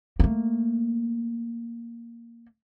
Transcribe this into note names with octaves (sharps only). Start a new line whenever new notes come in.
A3 A#3